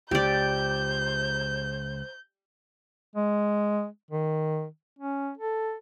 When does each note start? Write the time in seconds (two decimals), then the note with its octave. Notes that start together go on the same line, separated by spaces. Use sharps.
0.11 C#2 G4 C5 D5 G6
3.16 G#3
4.11 D#3
4.99 C#4
5.38 A4